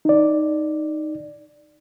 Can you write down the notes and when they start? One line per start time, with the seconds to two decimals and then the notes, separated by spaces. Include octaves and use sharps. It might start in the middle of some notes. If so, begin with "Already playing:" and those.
0.05 D#4 D5